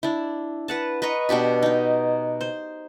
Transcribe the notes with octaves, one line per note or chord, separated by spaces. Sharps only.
D4 E4
B4 F#5 A5
B4 D#5 A#5 C#6
B2 D4 G4 B5
D#4 G4
C5